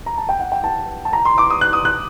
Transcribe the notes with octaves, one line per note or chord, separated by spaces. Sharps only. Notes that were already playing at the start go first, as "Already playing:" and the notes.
A#5
A5
G5
F#5
G5
A5
A5
A#5
C6
D6
D#6
F#6
D#6
F#6